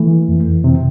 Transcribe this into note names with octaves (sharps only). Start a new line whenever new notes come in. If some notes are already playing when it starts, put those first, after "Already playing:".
Already playing: E3 A3
F2
C3